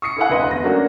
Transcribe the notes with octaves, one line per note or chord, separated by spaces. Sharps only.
C#6 D#6 C7 C#7
E4 A4 F5 F#5
F1 D2 B4 D#5 C6
E2 A#6
F#3 A3 A#3 C#4 D4 F#4